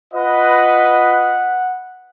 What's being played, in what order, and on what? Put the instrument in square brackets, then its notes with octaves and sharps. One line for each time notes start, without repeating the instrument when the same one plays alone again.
[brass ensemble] F4 B4 D#5 [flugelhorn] F#5